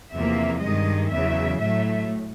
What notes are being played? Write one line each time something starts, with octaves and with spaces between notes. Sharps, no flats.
E2 C3 F3 A#3 E5
G2 D#3 G#3 D#5
E2 C#3 F#3 E5
A2 F#3 A3 E5